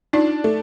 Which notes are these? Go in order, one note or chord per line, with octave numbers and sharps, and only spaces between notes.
D4 D#4 F4
A3